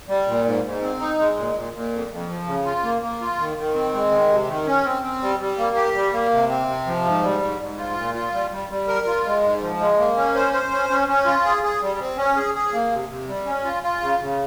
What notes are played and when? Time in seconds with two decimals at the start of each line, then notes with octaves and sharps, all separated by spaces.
0.08 G3
0.27 A#2
0.45 G#2
0.63 G#2
0.82 C4
1.00 D#4
1.19 G#3
1.36 A#2
1.55 A#2
1.73 A#2
1.91 F2
2.10 F2
2.29 F3
2.46 C#3
2.65 F4
2.83 A#3
3.02 A#3
3.20 F4
3.39 D#3
3.57 D#3
3.74 C4
3.93 G#3
4.11 D#3
4.29 C3
4.48 D#3
4.66 C#4
4.84 C4
5.02 C4
5.21 G3
5.40 G3
5.58 A#3
5.76 G4
5.95 G3
6.12 A#3
6.32 C3
6.50 C4
6.67 C3
6.86 F3
7.05 G#2
7.22 G3
7.42 G#2
7.59 G#2
7.78 F4
7.96 A#2
8.14 F4
8.33 G3
8.51 G3
8.69 G3
8.88 A#4
9.07 F4
9.25 G#3
9.43 G#2
9.61 F3
9.80 G#3
9.98 A#3
10.16 C#4
10.35 C5
10.53 C5
10.71 C#4
10.89 C#4
11.08 C#4
11.26 F4
11.44 G#4
11.63 G#4
11.81 G3
11.99 C4
12.18 C#4
12.36 G#4
12.55 G#4
12.73 A#3
12.91 C3
13.09 C3
13.28 G3
13.46 C#4
13.64 F4
13.83 F4
14.01 C#3
14.20 C#3